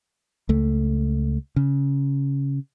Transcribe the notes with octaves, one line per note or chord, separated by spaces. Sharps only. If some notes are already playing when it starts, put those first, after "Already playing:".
C#2 A3
C#3